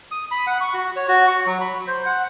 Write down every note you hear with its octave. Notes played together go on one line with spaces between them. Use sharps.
D#6
B5
F#5
C#6
F#4
C#5
F#4
C#6
F#3
B5
C5
F#5